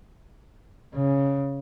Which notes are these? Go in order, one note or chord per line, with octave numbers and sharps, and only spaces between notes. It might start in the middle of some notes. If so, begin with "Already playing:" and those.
C#3